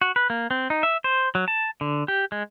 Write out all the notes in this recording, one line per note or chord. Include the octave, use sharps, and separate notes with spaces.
F#4
B4
A#3
C4
D#4
E5
C5
F#3
A5
D3
G4
G#3